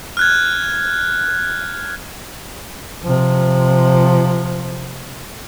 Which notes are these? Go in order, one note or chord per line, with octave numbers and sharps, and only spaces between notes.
F6 F#6 G#6
C3 F3